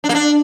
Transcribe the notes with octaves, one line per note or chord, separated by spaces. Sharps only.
D4
A#3
D4